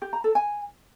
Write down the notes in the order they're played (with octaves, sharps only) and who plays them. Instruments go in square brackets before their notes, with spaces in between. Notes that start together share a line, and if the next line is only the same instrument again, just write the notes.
[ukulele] G4
A#5
A4
G#5